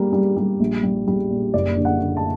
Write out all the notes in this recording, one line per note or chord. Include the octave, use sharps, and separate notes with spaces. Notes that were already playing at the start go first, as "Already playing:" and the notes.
Already playing: G3 A#3
G3
G3
A#1
G3
G3
A#2
F#1 D5
D3
F#5
D3
A5